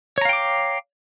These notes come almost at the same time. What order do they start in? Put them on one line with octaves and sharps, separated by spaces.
C#5 A#5 F5 G5 D6